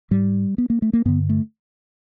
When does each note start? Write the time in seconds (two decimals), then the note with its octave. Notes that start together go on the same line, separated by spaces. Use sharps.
0.11 G#2 G3
0.58 B3
0.70 A#3
0.82 A3
0.93 A#3
1.05 G2 D3 B3
1.29 A3